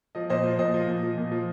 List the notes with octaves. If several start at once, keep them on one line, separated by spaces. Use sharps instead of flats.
F3 D#5
A#2 C5 D#5
F3
A#2 C5 D#5
F3
A#2
F3
A#2
F3